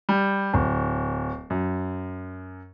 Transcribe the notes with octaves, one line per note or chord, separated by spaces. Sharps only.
G3
D1
F#2